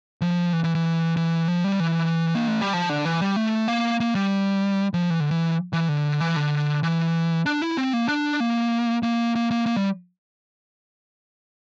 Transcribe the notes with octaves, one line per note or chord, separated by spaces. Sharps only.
F3
E3
E3
E3
E3
F3
G3
E3
A#3
A3
G3
F3
D3
E3
G3
A3
A#3
A#3
G3
F3
E3
D3
E3
E3
D3
E3
D3
E3
D4
E4
C4
A#3
D4
A#3
A#3
A#3
A#3
A#3
G3